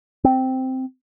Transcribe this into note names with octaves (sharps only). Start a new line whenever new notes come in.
C4